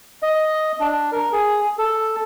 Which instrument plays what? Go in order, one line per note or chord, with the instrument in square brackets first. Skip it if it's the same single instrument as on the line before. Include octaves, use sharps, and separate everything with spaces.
[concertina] D#5
D4
A#4
G#4
A4